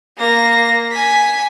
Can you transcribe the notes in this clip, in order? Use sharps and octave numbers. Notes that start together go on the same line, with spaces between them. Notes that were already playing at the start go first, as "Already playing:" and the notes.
A#3 A#6
G#5 B6